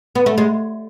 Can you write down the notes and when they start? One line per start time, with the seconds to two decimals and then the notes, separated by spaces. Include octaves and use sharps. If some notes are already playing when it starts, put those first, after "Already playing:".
0.15 B3
0.26 A3
0.38 G#3